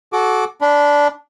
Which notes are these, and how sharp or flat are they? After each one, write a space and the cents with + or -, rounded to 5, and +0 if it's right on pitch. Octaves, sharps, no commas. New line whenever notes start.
F#4 +0 A4 -30 D6 -5
D4 -10 B5 +0